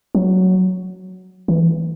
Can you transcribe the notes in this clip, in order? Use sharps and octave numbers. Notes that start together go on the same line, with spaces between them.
F#3
E3